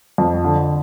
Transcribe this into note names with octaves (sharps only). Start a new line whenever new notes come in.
F2
D3